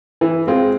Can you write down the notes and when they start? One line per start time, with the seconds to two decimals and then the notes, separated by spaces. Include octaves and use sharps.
0.21 E3
0.47 G#3 C4 F4